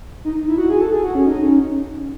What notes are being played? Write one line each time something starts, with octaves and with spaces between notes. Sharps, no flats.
D#4
E4
F#4
G#4
A4
G#4
F#4
C#4
D#4
C#4